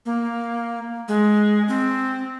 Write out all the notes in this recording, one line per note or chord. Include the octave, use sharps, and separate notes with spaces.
A#3
G#3
C4